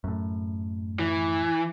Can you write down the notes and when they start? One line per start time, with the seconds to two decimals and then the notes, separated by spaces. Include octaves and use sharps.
0.04 F#2 A2
0.99 E3